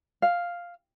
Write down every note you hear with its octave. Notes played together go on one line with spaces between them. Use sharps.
F5